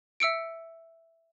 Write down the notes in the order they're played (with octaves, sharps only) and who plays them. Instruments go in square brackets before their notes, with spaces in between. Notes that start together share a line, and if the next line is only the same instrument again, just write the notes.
[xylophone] E5 E6 C#7 D7